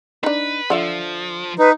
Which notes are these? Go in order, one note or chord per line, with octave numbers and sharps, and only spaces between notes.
D4 D#4 B4
D3 F3 F4 E5
D#4 B4